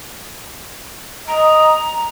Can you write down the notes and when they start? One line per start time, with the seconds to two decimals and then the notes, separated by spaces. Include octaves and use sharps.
1.28 D#5 A#5